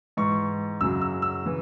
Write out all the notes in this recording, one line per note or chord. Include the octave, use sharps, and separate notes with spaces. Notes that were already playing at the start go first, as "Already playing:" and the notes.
G#2 E3 C#6
F#2 C#3 F#3 E6
E6
E6
C#3 E3